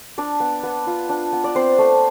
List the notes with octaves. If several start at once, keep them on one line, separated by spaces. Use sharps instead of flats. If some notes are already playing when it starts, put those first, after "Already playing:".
D4 D5
B3
B3
F4
D4
B3
D5
C4 C5
A3